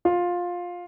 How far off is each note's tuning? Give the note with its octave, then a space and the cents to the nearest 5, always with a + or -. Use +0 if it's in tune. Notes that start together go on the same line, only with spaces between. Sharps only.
F4 +15